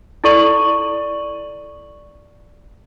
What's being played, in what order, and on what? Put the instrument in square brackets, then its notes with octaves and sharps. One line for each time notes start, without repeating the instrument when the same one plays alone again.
[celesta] E4 A4 D5 C#6 D#7 F#7